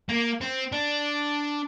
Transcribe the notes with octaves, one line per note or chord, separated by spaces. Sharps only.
A#3
C4
D4